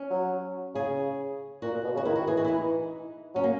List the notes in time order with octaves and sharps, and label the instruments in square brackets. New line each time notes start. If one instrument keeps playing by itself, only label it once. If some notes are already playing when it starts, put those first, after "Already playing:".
Already playing: [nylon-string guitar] C#4
[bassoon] F#3
[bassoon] C#3 [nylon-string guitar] G#4
[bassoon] A#2 [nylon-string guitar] F#4
[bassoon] A#2
B2
C#3
[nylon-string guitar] F#4
[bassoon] D#3 [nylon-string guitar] E4
[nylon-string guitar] F#4
[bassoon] E3 [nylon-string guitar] G#4
[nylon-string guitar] F#4
E4
D#4
[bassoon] F#3 [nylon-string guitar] C#4
[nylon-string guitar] A#3